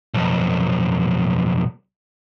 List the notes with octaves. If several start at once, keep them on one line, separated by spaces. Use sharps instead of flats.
B1 F2